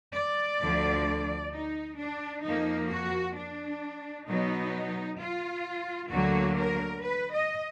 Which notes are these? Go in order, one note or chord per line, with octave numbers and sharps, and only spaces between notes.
D5
D2 D3 F3
D#4
D4
F2 F3 A#3 D#4
F#4
D4
B2 F#3 B3 D#4
F4
D2 D3 F#3 A#3 F#4
A#4
B4
D#5